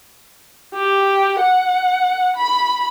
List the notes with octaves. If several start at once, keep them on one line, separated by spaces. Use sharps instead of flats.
G4
F#5
B5